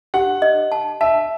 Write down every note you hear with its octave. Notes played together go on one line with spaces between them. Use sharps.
G4 F#5
D#5
A5
E5 A5